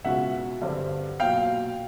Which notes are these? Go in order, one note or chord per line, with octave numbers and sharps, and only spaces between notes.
C#2 B2 G#3 C#4 F#4 E5 F#5
G2 D3 G3 C4
B1 A#2 F#3 F5 G5